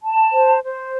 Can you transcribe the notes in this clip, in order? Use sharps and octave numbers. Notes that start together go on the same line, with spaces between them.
A5
C5
C5